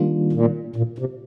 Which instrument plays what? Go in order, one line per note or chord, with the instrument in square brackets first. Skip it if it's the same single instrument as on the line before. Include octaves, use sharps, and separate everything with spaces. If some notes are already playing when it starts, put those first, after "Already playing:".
Already playing: [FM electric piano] D#3 G3 A#3 D4 F4
[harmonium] A#2
A#2
C3